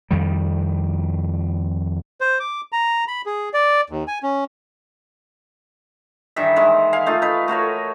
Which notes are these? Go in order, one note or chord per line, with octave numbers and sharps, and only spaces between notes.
F2 D#3 G3
C5
D6
A#5
B5
G#4
D5
D#2
G#5
C#4
G2 D#3 E3 E5
D#3 E3 G#3
F5 G#5
A3 D#4 F4
D#4 B4
A3 F#4 A#4 C#5